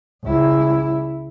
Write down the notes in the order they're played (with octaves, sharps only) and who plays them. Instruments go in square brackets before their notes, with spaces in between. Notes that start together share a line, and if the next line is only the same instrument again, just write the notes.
[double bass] C#2 E4